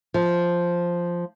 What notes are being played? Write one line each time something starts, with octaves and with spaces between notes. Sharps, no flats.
F3